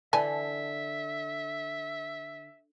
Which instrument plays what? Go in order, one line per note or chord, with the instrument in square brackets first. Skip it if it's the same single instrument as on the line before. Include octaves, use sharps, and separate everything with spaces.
[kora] D3 [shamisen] E3 G#5 A5 [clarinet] E5